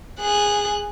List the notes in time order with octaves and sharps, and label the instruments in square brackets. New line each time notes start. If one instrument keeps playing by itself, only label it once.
[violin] G#4 F#6